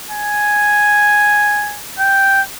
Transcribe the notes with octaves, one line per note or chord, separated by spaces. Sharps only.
G#5
G5